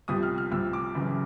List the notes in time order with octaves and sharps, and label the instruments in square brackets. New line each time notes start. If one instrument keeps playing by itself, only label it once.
[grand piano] C2 C3 F3 D#6
F6
F6
C2 C3 F3 E6
D6
F#1 F#2 C#3 E3